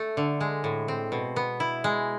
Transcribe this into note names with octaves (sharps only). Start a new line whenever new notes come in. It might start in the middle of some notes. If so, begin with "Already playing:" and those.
Already playing: A3 A4
D3
G#3
A2
C4
B2
B3
E4
G#3